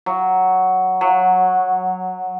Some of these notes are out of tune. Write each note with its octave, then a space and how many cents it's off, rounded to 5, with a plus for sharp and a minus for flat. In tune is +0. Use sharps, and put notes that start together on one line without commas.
F#3 +5
F#3 -10